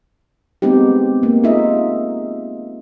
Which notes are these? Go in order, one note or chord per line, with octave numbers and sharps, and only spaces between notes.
G#3 B3 C4 D#4 G4
A#3
D#4 F4 G#4 D#5 E5